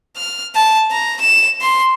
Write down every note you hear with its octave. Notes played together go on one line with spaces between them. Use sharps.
F6
A5
A#5
E7
C6